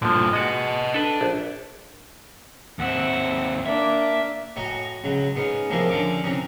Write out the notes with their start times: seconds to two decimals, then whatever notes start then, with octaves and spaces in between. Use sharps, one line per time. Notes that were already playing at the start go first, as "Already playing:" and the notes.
0.02 G2 A#2 D3 F3
0.33 G#3 F#4 B4 D#5
0.94 D4 A4 B4
1.21 A#1
2.79 D#2 C4 E5 F#5
3.66 A#3 D4 E5
4.56 A2 F#4 C#5 D#5 G#5 A#5
5.04 C#2 F#3
5.36 G#2 B3 C#4
5.70 A2 C3 F3 G#3 A#3 E4
5.90 D3 F3 C#4 D6
6.23 C3 E3 C#4 A#5 D#6